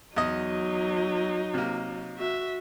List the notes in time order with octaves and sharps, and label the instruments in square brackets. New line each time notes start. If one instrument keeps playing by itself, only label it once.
[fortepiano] E2 D#5 [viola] F#3 D#4
[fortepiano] C3 A#3
[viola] F#4 E5